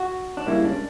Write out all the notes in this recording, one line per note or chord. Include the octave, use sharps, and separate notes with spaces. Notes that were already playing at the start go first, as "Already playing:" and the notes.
Already playing: F#4
D4
C#2 C#3 G3 A#3 E4
D4